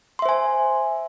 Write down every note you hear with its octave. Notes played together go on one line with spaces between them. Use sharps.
C5 E5 G#5 C6